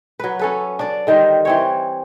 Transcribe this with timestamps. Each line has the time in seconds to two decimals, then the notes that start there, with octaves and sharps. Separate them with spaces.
0.20 F#3 B4
0.39 C#4 A4 B4
0.79 D4 D5
1.07 D3 D#3 G3 C5
1.45 E3 C4 C#5